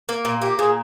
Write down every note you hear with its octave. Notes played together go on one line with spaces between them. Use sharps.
A#3
A#2
A#3 G4
A#2 G#4